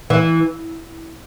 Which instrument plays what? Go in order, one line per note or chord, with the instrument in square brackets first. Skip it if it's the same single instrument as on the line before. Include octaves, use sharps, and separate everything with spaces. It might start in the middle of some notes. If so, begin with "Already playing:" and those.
[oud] E3